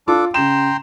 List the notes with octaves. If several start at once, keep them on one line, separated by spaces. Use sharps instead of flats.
D4 F4 A4 D6
C#3 G5 A#5 C6 E7